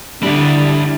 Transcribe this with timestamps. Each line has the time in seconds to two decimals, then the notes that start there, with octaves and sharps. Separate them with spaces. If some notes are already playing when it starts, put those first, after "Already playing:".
0.23 D3 G3 D4 E4 D5 E5